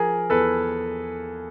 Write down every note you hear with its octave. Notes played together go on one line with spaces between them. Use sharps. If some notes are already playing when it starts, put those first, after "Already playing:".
Already playing: F3 G#4 A#4
E2 A4 B4